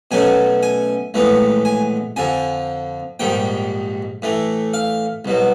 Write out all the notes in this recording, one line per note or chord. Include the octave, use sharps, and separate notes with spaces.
B2 F#3 A3 C#4 G#5
G#5
A#1 A2 E3 G#3 B3
G#5
F2 D3 F3 G#5
A#1 G#2 D#3 G3 G5
A2 E3 A3
F5
C2 B2 F#3